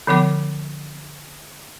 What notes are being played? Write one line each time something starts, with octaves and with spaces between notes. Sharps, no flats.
D3 F3 B3 D6